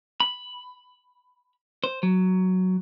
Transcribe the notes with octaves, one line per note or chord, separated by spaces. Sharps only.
B5
C5
F#3